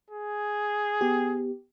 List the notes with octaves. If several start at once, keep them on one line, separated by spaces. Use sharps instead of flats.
G#4
B3 G4